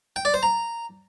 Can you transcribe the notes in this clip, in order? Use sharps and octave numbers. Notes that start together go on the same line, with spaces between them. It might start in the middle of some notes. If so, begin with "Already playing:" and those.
G5
D5
C5
A#5